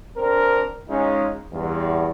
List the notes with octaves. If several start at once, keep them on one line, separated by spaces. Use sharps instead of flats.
C4 D4 A#4
G#3 C#4 D#4 F4
E2 G2